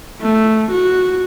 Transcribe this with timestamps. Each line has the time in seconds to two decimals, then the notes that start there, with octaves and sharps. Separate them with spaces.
0.22 A3
0.72 F#4